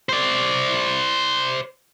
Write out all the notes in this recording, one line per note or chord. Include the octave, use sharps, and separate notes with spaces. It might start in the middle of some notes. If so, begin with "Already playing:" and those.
C5 D5